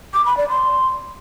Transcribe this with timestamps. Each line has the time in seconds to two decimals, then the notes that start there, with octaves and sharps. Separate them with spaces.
0.14 D6
0.25 B5
0.37 D5
0.49 C6